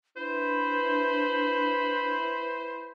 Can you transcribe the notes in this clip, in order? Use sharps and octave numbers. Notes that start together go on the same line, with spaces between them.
D4 E4 B4 C5 B5